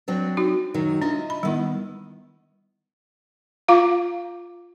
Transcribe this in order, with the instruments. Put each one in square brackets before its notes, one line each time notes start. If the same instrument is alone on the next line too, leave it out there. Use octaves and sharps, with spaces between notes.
[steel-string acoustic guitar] F#3 C4 D4
[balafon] D#4 F#4
[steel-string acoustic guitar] F#2 D#3 F#3
[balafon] D4 [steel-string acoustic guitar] F4 D#5 E5
[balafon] B5
[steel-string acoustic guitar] D#3 B3 [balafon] G3 E4
[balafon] F4 F5 A#5 D6